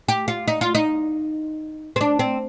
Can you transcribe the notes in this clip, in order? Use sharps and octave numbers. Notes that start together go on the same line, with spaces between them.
G4
F4
D#4
F4
D#4
C4
D4
C4